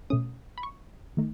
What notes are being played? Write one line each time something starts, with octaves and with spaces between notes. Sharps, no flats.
B2 A3 C#4 D#6
B5
C#6
D#3 A3 D#4